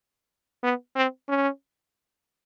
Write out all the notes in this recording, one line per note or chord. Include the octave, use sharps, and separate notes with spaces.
B3
C4
C#4